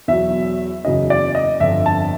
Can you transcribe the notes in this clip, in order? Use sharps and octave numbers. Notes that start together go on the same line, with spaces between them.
E2 B2 F#3 E5
F#1 E2 C#3 F#3 D#5
D5
D#5
G1 F2 D3 E5
A5